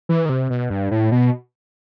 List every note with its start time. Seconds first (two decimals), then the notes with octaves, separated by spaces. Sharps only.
0.09 E3
0.25 D#3
0.29 C3
0.50 B2
0.70 G2
0.91 A2
1.12 B2